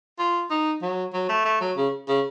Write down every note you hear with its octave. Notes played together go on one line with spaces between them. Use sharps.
F4
D#4
F#3
F#3
A3
A3
F#3
C#3
C#3